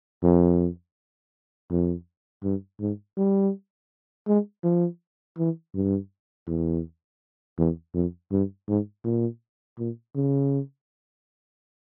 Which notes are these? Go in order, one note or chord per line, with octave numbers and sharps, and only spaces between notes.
F2
F2
G2
G#2
G3
G#3
F3
E3
G2
E2
E2
F2
G2
G#2
A#2
A#2
C#3